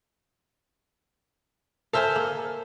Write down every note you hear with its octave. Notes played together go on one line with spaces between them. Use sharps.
A4 C5 E5 F5 G#5
A#3